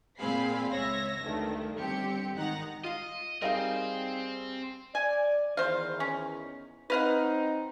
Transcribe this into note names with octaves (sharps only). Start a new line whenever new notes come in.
A#2 C4 G#4 F5 B5 C7
C#2 C#5 E5 A#6
D2 G2 D#3 A3
G1 C4 G4 C#7
G#1 D#3 D#4 F#5 A#5
F4 D#5 F5
G3 C4 D#4 G#4 A#4 D#5 F5
D5 G#5
E2 D#3 E3 C5 F5
C#4
C4 D#4 B4 F5 F#5